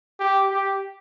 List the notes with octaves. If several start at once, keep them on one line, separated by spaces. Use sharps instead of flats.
G4
G4